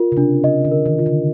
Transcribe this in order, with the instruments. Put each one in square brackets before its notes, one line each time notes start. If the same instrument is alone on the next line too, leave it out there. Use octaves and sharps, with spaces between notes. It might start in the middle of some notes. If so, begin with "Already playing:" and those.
Already playing: [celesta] F4 A#4
[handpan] C#3
[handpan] C3 [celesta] D4
[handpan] C#3 [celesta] D#5
[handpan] D3
[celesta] A#4
[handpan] D#3
[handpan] C#3 [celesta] F4
[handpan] D3